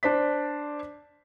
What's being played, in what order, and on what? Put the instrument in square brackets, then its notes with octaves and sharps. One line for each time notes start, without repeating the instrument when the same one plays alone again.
[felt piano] D4 C5 D5 B6